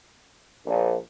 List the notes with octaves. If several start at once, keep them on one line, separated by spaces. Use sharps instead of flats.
A#1